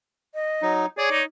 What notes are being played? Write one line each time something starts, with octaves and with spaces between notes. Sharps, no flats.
D#5
F#3 D#4
G#4 C#5 D5
D#4